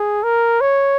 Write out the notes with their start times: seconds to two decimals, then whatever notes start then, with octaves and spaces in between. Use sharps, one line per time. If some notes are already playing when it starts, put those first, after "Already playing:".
Already playing: G#4
0.23 A#4
0.61 C#5